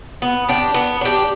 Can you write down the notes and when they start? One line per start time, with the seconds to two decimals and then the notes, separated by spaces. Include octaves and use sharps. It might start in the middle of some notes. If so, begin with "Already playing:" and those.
0.22 B3
0.49 D4 G4
0.74 B3
1.01 D4 G4